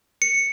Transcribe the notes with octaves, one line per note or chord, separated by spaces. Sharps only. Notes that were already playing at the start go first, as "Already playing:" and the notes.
C#7